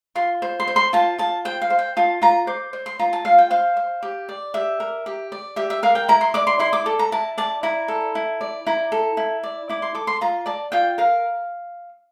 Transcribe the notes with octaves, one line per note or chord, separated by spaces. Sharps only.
F4 C6
C5
C6
C5
C6
F4 A5
F4 A5
C5 G5
F5
C5
G5
F4 A5
F4 A#5
C5 D6
C5
C6
F4 A#5
A5
F4 F5
G5
C5 F5
C5
G4
D5
G4 E5
A#4
G4
D5
G4 E5
E5
A#4 F5
G5
E4 A#5
C6
D5 D6
C6
E4 C6
D6
A4
A#5
E4 A5
D5 A5
E4 A#5
A4
E4
D5
E4 A#5
A4
E4
D5
E4 D6
C6
A4 D6
C6
F4 A#5
D5 A5
F4 G5
A#4 F5